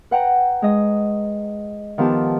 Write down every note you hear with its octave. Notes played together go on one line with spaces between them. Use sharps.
B4 F#5 G5 A#5
G#3 D#5
D#3 F3 B3 G4 A5